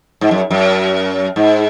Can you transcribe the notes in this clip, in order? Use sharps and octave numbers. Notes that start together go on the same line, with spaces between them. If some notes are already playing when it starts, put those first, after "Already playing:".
G#2
F#2
F#2
G#2